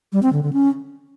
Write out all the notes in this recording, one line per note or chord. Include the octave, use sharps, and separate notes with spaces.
G3
C4
D3
D3
C#4